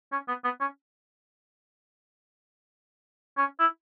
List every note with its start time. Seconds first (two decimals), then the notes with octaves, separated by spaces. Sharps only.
0.12 C#4
0.28 B3
0.44 B3
0.61 C#4
3.38 C#4
3.59 E4